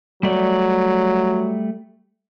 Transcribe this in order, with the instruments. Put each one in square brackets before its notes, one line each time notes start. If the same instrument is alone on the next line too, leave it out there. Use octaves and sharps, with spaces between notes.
[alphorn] F#3 [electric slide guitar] G3 A3 D5